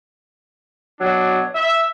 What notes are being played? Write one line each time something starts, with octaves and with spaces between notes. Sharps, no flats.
B2 F#3 D4
E5